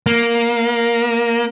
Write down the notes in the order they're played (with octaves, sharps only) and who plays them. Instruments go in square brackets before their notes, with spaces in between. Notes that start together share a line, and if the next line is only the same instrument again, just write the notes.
[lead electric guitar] A#3